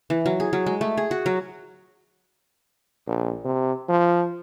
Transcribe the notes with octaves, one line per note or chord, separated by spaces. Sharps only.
E3
F#3
G#4
F#3
G#3
A3
G#4
F#4
F#3
A#1
C3
F3